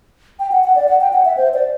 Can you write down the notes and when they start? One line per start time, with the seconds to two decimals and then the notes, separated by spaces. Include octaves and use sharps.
0.39 G5
0.51 F#5
0.64 F#5
0.76 D5
0.88 F#5
1.01 G5
1.13 F#5
1.25 E5
1.37 C5
1.54 D5